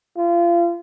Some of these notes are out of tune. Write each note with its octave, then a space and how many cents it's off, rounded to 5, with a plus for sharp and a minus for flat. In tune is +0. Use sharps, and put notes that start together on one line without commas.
F4 -30